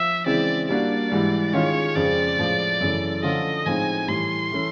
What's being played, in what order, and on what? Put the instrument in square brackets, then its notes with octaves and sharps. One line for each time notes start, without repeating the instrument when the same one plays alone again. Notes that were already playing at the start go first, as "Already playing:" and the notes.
Already playing: [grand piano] F3 [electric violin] E5
[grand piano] C#3 E3 G#3 C4 E4 [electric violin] D5
[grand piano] G3 A#3 D4 F#4 [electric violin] D5
[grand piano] G#2 E3 G3
[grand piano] D#3 G#3 C#4 F4 G#4 [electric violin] C#5
[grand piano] F2 C#3 F3 G#3 C4 [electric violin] D5
[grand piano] A2 F3 G#3
F#2 C#3 E3 A3
[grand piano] D3 F3 A3 C#4 F4 [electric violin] D#5
[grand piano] A2 F3 G#3 C4 D#4 [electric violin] G#5
[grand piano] A2 E3 G3 [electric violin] C6
[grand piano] E3 A3 C#4